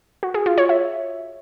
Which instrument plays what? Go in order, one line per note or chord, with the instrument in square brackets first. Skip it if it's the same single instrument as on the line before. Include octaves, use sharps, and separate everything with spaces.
[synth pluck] F#4
G#4
F4
C#5
E5